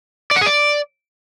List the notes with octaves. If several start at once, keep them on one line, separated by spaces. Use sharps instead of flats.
D5
F#5
G#4
D5